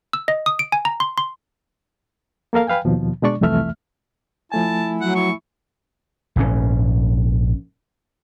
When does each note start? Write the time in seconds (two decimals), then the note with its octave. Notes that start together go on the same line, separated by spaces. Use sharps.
0.13 E6
0.28 D#5
0.46 D#6
0.59 D7
0.72 G#5
0.85 A#5
1.00 C6
1.18 C6
2.53 A#3 A4 A#4 F5
2.67 B4 F5 G5 G#5
2.85 D#2 B2 F3
3.22 B2 G#3 D4 D5 C#6
3.41 C2 F2 E3 A3 E5 F6
4.52 F3 A3 E4 G#5 A5
5.01 F#3 F#5
5.15 E4 C#6
6.36 A#1 G#2 C3 C#4